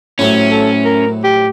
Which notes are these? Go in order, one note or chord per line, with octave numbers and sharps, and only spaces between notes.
A2 C3 F#3 C#4
A4
A#4
G4